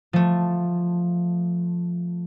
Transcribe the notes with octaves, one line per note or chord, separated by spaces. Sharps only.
F3 A3